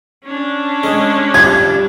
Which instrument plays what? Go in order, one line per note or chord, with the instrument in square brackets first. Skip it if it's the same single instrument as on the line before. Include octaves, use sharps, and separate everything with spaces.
[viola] C#4 D4
[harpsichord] G#3
[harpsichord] G3 F4 [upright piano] G#6